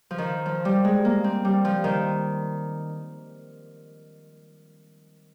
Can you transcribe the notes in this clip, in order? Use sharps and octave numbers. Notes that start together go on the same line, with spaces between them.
F3
D#3
F3
G3
G#3
A#3
C4
G3
F3
D#3